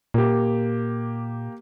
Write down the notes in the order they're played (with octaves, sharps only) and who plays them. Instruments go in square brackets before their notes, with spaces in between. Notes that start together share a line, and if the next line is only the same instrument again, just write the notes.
[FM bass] A#2 [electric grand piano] A#3 G4